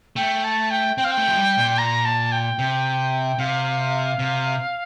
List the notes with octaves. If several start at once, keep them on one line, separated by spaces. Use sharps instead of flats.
A3 G5
A5
G5
C4 G5
F5
G5
A3
F3
G3
A#2
A#5
A5
G5
C3
C3 F5
C3